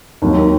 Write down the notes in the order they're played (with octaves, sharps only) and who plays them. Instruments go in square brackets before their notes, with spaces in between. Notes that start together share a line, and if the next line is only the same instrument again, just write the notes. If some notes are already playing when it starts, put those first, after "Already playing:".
[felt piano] D#2 D#3 F#3 A#3